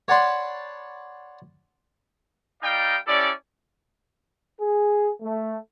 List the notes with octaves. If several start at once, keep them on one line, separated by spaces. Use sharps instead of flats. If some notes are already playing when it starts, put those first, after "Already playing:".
C#5 D5 F#5 A5 B5 C6
G3 D#4 D5 D#5 F5 G5
C#4 E4 G4 A4 D5
G#4
A3